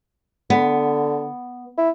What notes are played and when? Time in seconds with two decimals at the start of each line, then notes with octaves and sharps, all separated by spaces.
0.50 D3 B3
1.78 E4